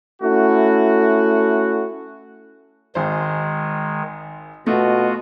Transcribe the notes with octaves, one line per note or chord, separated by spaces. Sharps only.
A3 C#4 E4 F#4
G#1 D#3 G#3 C5
B2 A3 F4 F#4 D#5